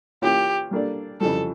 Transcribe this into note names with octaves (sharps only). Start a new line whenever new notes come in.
E3 A#3 C#4 F4 G4
G3 A#3 D4 A4 D5
F2 C#3 E3 G3 A4